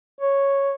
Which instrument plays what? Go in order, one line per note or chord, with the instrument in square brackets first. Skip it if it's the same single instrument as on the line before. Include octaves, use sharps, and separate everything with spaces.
[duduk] C#5